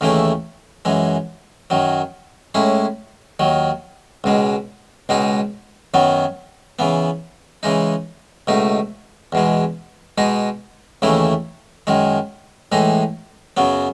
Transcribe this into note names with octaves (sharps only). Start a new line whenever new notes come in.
D#2 C#3 E3 A3 E4
F#2 E3 G#3
F#2 D#3 F#3
A2 G#3 C#4 E4
D#2 D#3 F#3
C#2 B2 G#3
C#2 B2 G#3 D#4
F#2 D#3 F#3 B3
C#3 E3 B3
C#3 E3 G#3 D#4
C#2 B2 A3 D#4
E2 B2 G#3
B2 G#3 D#4
D#2 C#3 E3 A3 E4
F#2 D#3 G#3
A2 E3 G#3 D#4
F#2 C#3 F#3 B3